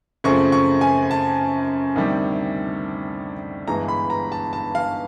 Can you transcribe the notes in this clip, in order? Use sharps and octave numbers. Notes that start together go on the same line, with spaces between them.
F#2 C#3 F3 A3 C4 C#6
C#6
G#5
A5
D2 C3 D#3 G3
G1 G2 E3 G#3 A#5
B5
A#5
A5
A5
F5